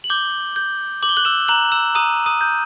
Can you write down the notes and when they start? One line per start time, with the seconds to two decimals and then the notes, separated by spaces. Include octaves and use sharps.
0.04 F#7
0.10 D6 G6 G7
0.56 G6
1.02 D6 F#7
1.09 G7
1.17 F#6 F#7
1.25 E6 E7
1.48 A#5 F#6 F#7
1.72 E6 E7
1.95 A#5 D#6 D#7
2.26 D#6 D#7
2.41 G6